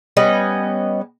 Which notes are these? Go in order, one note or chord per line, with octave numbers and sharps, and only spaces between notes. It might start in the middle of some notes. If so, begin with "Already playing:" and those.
G3 B3 C#4 D#5